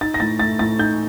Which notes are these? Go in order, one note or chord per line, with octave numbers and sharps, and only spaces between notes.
D#4 A6
A#6
A2 A6
A3 A6
A2 A6
D#4 G6